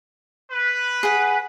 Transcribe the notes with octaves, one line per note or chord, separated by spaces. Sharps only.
B4
G#4 F#5